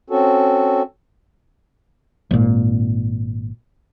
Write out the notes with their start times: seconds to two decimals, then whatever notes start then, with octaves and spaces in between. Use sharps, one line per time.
0.10 C4 C#4 F#4 A4
2.31 G#1 A#2